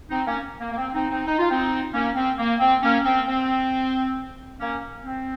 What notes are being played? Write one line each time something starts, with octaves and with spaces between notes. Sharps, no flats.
C4 D#4
A#3 C#4
A#3
A#3
C4
C4 D#4
C4 D#4
D#4
F4
C4 D#4
A#3 C#4
C4
A#3
C4
A#3 C#4
C4
C4
A#3 C#4
C4